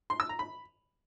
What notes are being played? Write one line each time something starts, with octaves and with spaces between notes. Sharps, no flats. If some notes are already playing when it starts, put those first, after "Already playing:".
C6
E6
A#5
B5